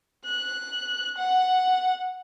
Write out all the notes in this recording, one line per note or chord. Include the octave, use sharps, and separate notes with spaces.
F#6
F#5